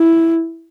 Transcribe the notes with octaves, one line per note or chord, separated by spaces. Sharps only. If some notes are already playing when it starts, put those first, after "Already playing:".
Already playing: E4